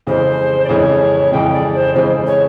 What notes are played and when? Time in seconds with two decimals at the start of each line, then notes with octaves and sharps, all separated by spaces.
0.07 F2 C#3 E3 G#3 C5
0.64 D5
0.69 F2 C#3 E3 G#3 C#5
1.32 F2 C#3 E3 G#3 G5
1.52 D5
1.73 C5
1.94 F2 C#3 E3 G#3 C5
2.26 C#5